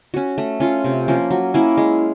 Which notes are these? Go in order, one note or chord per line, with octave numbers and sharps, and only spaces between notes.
C#4 F#4
A3
C#4 F4
C3
F3 A#3 C#4
F#3
A#3 C#4 E4
G#3